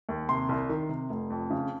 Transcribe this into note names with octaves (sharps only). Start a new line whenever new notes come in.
D#2
C3 C6
C2
D#3
C3
F1
F2
C#3